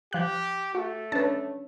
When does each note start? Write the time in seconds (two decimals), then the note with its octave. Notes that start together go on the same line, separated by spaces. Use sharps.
0.13 F3 G4 F#6
0.75 A3 F#4
1.12 C#4 D4 B4 A5